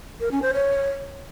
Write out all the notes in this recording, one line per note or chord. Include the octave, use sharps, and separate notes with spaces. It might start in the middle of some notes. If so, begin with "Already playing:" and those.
A#4
C#4
C5
C#5